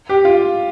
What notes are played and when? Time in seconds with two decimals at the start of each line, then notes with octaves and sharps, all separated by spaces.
0.09 G4
0.25 F4